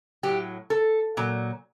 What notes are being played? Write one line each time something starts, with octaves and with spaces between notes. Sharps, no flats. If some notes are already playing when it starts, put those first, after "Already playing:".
F#3 G4
A2
A4
A#2 F#3